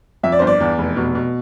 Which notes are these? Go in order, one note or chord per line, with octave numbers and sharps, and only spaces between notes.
F2 E5
D5
G1 C5
D5
E2
F1
B2
B2